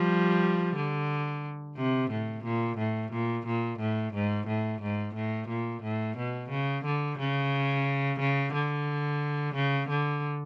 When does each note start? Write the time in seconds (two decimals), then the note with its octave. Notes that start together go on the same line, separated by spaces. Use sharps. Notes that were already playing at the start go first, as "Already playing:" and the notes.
Already playing: F3 G3
0.76 D3
1.77 C3
2.11 A2
2.44 A#2
2.78 A2
3.12 A#2
3.46 A#2
3.80 A2
4.14 G#2
4.47 A2
4.82 G#2
5.15 A2
5.49 A#2
5.83 A2
6.17 B2
6.50 C#3
6.85 D3
7.19 C#3
8.20 C#3
8.54 D3
9.55 C#3
9.90 D3